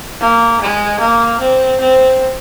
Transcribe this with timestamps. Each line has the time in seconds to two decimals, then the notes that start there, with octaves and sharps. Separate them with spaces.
0.21 A#3
0.61 G#3
1.00 A#3
1.40 C4
1.80 C4